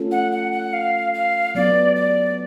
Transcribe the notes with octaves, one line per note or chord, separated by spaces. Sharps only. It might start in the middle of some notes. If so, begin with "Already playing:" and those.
Already playing: A3 C#4 F4 A4
F#5
F#5
F#5
F5
F5
F#3 B3 D4 D5
D5